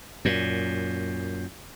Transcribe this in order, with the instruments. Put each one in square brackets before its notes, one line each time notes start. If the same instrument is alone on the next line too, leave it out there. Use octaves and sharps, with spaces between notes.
[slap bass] F#2 A#2